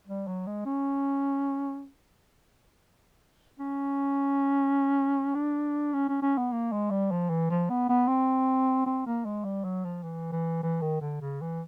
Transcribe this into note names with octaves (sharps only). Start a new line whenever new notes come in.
G3
F#3
G#3
C#4
C#4
D4
C#4
C#4
C#4
B3
A#3
G#3
G3
F3
E3
F3
B3
B3
C4
C4
A#3
G#3
G3
F#3
F3
E3
E3
E3
D#3
D3
C#3
E3